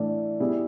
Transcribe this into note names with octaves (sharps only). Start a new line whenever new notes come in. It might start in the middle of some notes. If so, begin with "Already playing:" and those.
Already playing: A2 E3 A3 D4
G3 B3 E4 G#4